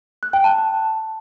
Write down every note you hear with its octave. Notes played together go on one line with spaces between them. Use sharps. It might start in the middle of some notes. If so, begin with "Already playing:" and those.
F#6
G5
A5